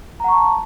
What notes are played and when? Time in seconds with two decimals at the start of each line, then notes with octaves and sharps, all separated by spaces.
0.20 A#5
0.24 F#5
0.28 C#6
0.33 A5